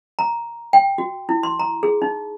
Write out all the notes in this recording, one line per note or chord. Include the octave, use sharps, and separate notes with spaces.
A#5
G5
F#4
E4
C6
A#5
G#4
D#4